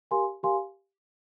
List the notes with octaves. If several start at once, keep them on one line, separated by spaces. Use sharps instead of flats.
G4 A#4 F5 G#5 C6
G4 A#4 F5 G#5 C6